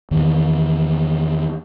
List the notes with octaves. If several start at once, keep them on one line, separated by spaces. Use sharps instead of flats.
E2 D#3 E3